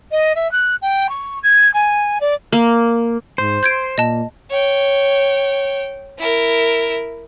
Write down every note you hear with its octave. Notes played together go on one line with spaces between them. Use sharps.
D#5
E5
F#6
G5
C#6
G#6
G#5
D5
A#3
G#2 C5
C6 G6 G#6 D7
A#2 D#5 A5
C#5 G5
E4 A#4